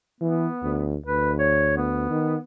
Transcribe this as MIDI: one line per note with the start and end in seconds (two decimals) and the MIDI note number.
0.21 0.47 52
0.21 0.92 59
0.63 0.97 38
1.06 2.08 38
1.06 1.32 71
1.39 1.73 73
1.77 2.44 59
2.10 2.36 51